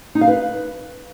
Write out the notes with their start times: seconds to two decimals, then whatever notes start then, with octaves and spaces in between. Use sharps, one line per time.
0.15 D#4
0.21 F5
0.28 B4